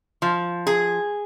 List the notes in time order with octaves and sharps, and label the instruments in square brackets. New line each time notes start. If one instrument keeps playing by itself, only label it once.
[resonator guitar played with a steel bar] F3
G#4